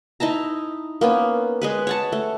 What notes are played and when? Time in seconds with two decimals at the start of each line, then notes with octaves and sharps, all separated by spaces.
0.20 D#4 E4 A5 A#5
1.01 A#3 B3 C#4
1.62 G#3 G#4 B4
1.87 C#5 F#5 A5
2.12 A3